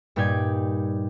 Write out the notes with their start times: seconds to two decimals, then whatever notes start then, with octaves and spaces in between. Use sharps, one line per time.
0.16 G2 A#2 D#4 G4 D5 G#6